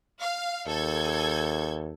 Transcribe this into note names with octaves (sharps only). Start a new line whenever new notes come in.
F5
D#2 A4 G6 G#6